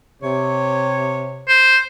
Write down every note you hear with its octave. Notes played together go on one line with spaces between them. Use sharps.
C3 C#5
C5